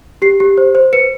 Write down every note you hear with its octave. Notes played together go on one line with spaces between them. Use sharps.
G4 C7
G4
C5
C5
B4 C#7